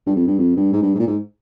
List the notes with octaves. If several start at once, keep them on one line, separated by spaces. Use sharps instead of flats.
G2
F2
G2
F2
G2
G#2
G2
G#2
A#2
G#2